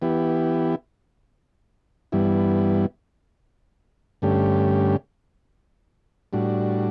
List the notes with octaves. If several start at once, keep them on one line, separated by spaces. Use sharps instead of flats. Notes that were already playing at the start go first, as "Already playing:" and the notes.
E3 B3 E4 G4
G2 E3 G3 B3 E4
G2 D3 A3 C#4 G4
A2 G3 D4 F#4